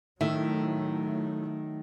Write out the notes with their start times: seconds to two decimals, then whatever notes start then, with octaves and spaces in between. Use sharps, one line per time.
0.21 A2 D#3 F#3 A3 E5